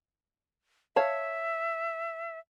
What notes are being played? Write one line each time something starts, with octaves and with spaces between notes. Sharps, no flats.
C#5 E5 F5 A5